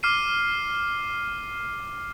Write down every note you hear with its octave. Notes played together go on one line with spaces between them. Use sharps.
D6 F6 C7 D#7